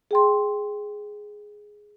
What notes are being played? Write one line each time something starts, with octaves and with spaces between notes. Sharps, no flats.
G#4 G5 C6